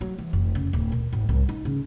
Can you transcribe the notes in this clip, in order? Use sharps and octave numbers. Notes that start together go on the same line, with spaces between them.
F#3
E3
F1
C#3
D1
A#2
G#1
C2
D#4
C#3